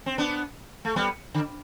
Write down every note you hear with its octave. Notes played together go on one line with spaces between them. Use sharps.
C4
B3 D4
A3
G3 B3
D3